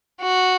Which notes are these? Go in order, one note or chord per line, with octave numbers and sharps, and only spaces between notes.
F#4